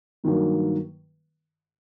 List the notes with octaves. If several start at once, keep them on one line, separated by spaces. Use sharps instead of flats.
G2 D#3 F#3 A#3